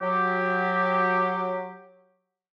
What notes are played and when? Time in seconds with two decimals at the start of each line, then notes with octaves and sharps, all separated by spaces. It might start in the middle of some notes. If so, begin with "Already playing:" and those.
0.02 F#3 G4